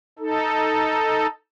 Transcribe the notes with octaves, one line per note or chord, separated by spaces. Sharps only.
D#4 A4